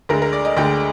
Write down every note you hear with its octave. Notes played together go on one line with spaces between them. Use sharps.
D2 D3 G#3 A#4
A#4
D5
D#5
D2 D3 G#3 G5